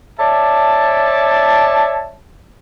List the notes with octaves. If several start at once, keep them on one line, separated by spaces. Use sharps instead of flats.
C#5 D5 E5 A5